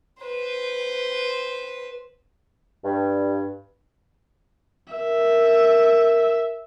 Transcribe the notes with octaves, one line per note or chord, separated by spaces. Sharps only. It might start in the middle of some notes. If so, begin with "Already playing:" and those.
B4 C5
G2
A#4 E5